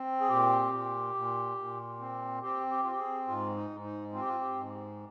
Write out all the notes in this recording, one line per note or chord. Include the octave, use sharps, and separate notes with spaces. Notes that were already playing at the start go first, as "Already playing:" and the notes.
Already playing: C4
G#4
A#2 G4
A#2
A#2
A#2
C4
C4 G4
G4
C4 F4
G4
G#4
G#2 F4
D#4
G#2
D#4
C4 F4
G4
F4
G4
G#2